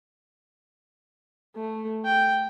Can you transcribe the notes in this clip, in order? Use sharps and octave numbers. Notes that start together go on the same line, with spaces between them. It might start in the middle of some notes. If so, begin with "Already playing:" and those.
A3
G5